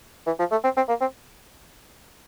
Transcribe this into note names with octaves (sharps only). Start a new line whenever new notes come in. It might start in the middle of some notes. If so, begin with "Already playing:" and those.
E3
F3
A3
C4
C4
A#3
C4